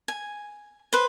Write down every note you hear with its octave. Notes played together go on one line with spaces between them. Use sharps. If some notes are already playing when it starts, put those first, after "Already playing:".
G#5
B4 C5